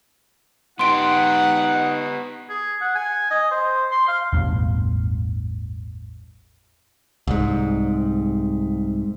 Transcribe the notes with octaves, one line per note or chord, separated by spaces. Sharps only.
B3 D#4 G4 F#5 C6 D7
G#4
F#5
G#5
D#5
C5
C6
F5
E1 A1 E2 G2
C2 G#2